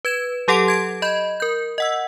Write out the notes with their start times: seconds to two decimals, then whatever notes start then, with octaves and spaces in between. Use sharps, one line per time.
0.05 B4 G#6 E7
0.48 F#3 G4 A4 F#5 C6 D7
0.68 G#6 D7
1.02 D#5 B5 G6
1.40 A#4 G6
1.78 D#5 F#5 E6